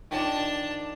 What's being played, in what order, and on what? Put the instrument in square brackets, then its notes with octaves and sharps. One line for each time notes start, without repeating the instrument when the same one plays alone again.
[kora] D#3 F3 [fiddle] D4 A5